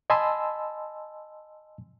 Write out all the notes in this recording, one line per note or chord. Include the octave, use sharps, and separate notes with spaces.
D#5 G#5 A5 B5 C6 E6